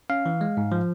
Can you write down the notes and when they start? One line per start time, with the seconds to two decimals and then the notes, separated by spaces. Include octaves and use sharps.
0.10 C#4 F5
0.26 E3
0.41 G#3
0.57 G#2
0.72 F3